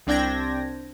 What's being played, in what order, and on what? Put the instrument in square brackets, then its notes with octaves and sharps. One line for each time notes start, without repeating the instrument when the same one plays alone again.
[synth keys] C2 C4 D4 G5 G#6 A#6